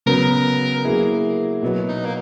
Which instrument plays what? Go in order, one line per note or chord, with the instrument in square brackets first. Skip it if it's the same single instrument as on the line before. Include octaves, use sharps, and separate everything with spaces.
[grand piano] C#3 F#3 B3 [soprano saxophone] A#4
[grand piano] F#3 A#3 E4 G#4
B2 F#3 B3
[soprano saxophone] D#4
A#3